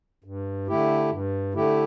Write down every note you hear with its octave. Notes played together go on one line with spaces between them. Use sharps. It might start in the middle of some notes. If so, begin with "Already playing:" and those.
G2
D3 A3 E4 G4
G2
D3 A3 E4 G4